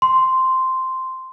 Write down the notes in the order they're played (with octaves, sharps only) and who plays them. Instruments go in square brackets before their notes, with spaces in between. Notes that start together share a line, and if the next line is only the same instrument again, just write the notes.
[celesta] C6